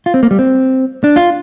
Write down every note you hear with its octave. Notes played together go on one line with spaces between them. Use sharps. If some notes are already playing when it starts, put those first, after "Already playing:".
F4
C4
A#3
G3
C4
D4
F4